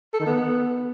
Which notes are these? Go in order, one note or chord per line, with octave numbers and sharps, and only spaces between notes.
A4
D#3
B3